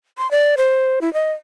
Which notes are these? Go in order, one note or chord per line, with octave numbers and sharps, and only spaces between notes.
C6
D5
C5
E4
D#5